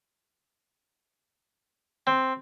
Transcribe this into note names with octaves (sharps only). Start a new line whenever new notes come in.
C4